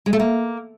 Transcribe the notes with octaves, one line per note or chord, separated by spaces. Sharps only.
G#3
A3
A#3